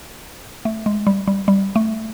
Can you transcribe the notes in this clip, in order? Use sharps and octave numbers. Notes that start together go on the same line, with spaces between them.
A3
G#3
G3
G3
G3
A3